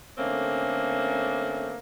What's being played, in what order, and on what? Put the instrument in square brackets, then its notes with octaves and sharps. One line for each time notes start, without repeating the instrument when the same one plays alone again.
[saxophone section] D3 A3 A#3 C4 C#4